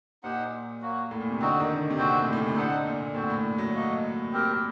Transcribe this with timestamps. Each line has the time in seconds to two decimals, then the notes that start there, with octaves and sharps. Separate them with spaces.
0.23 A#2 D#4 G4 C5 F#5
0.81 F#3 A#3 F#4
1.11 A2
1.20 A#2
1.30 C3
1.40 D3 C4 D#4 F#4
1.60 D#3
1.69 D3
1.90 C3
1.98 A#2 C4 F#4 C5
2.18 A2
2.33 A2
2.37 A#2
2.48 C3
2.56 D3 D#4 A4 C5 F#5
2.86 A#2
3.15 A2 C4 F#4 C5
3.30 A2
3.58 F#3
3.73 A#3 F#4 A4 D#5
4.32 C4 G4 A#4